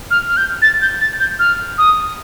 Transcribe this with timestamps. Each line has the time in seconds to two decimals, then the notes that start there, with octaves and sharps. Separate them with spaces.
0.11 F6
0.28 F6
0.37 G6
0.62 A6
0.81 G6
1.01 A6
1.20 G6
1.39 F6
1.78 D#6